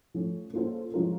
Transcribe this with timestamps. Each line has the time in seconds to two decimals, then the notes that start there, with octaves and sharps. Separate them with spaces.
0.14 F3 A3 C#4
0.53 A#3 C#4 F4 A4 C5
0.94 F3 G#3 C#4 F4 A#4